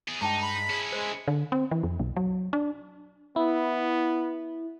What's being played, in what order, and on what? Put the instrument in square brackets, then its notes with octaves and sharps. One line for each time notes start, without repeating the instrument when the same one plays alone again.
[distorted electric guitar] B3 G#4
[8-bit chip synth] G2 G#3 A#5 [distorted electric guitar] D#4 [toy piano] G5 A5 D6
[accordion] B5
[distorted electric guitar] C#4 E4 [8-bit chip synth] G#4
[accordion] G#3 [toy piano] C5
[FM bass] D3
C4
E3
F2
B1
F#3
D4
[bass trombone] B3 [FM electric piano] E4